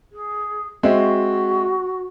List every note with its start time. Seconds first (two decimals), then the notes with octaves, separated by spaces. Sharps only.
0.12 G#4
0.83 G#3 C4 F#4 E5